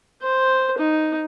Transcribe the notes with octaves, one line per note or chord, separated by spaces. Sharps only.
C5
D#4